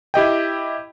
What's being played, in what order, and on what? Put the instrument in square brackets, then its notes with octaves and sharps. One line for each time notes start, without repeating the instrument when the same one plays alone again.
[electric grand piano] E4 G4 D#5 G5